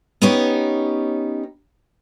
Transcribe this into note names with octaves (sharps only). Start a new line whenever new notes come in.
B3 C#4 D#4 G4 C#5